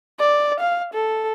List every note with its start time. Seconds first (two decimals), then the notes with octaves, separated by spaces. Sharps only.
0.20 D5
0.60 F5
0.94 A4